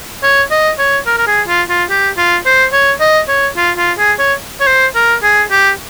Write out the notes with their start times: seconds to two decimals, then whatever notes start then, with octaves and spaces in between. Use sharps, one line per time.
0.23 C#5
0.51 D#5
0.78 C#5
1.07 A#4
1.18 A#4
1.27 G#4
1.48 F4
1.69 F4
1.90 G4
2.17 F4
2.45 C5
2.73 C#5
3.00 D#5
3.28 C#5
3.57 F4
3.77 F4
3.98 G#4
4.19 C#5
4.61 C#5
4.67 C5
4.95 A#4
5.23 G#4
5.51 G4